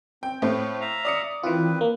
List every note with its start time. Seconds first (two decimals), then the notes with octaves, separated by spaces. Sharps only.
0.23 C4 G5
0.42 A2 A3 C4 F5
0.81 E5 F5 A#5
1.05 D5 D#6 C#7
1.43 D#3 E3 C4 F4 B4
1.81 A#3